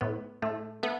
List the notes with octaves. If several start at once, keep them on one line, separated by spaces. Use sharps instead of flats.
A2 B3
A2 A3
A3 B3